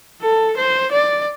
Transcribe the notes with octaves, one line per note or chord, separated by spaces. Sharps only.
A4
C5
D5